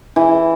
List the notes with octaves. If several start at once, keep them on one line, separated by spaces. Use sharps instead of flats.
E3